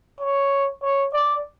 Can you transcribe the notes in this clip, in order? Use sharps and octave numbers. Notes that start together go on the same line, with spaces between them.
C#5
C#5
D5